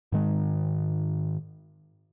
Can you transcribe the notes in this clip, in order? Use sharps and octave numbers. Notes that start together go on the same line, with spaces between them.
G#2 D#3 G#3